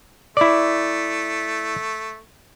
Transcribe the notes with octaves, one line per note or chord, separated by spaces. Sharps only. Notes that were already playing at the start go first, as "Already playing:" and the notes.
A3 E4 D5